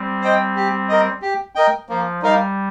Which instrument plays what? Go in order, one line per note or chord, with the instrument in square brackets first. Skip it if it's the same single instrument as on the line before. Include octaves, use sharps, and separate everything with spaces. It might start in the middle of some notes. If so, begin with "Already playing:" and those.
Already playing: [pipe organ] G3 C4
[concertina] C5 D#5 G5
G4
A#4 D#5
G4
A#4 D#5 G5
[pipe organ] F3 [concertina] A#3
[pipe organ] G3 [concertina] D#4 A#4 F5